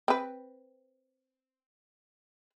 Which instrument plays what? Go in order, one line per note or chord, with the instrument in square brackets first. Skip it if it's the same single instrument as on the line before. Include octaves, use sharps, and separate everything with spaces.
[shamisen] C4 B4